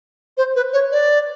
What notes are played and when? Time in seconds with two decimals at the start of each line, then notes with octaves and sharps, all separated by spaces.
0.37 C5
0.55 B4
0.73 C#5
0.92 D5